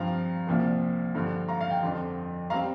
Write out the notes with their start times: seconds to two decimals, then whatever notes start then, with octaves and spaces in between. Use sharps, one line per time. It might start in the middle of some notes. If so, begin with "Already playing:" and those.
Already playing: G2 F3 C4 F5 A#5
0.47 C2 A#2 F3 C4
1.15 G2 D3 F3
1.49 F5 A#5
1.61 F5
1.71 G5
1.82 F2 D3 F3
2.50 G3 C4 F5 A#5